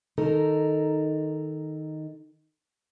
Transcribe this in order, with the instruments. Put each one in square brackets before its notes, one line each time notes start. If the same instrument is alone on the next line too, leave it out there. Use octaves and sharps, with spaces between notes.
[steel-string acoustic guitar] D#3 D#4 A4 A#4